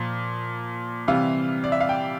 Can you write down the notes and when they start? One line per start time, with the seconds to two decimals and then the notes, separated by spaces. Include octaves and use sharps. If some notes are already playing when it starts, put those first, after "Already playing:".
Already playing: A#2 F3
1.08 C3 E3 G3 F5
1.64 D5
1.72 E5
1.81 F5
1.89 G5